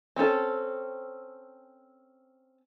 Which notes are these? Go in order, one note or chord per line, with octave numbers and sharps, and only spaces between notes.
C4 C#4 E4 A4